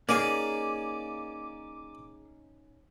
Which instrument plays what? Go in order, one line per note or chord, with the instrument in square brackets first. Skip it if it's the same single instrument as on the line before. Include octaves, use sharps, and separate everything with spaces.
[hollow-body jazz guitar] A#3 G#4 [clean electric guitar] C#4 D#4 [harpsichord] D5 G#5 [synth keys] D6